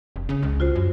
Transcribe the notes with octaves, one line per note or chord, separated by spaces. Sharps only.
F1
C#3
C#2
F4 F#4 C5
F#2